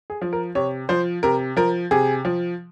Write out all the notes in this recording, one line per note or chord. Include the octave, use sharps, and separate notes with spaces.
G#4
F3
A#4
C3 C#5
F3 C5
C3 A#4
F3 A#4
C3 G#4
F3